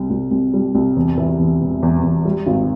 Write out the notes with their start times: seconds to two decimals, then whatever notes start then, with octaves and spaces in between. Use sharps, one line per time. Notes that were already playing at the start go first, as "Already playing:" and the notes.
Already playing: C2 G3
0.10 C2
0.31 C2
0.54 G3
0.75 C2
0.96 E2
1.18 E3
1.39 E2
1.61 E1
1.83 E2
2.03 E2
2.25 G3
2.47 G#1